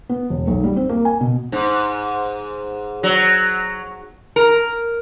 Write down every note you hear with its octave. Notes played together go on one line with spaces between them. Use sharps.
B3
E1
B1
G3
C4
A#3
G#5
B2
G#2
F#3
A#4